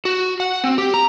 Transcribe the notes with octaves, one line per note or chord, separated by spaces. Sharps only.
F#4
F#5
C4
G4
A#5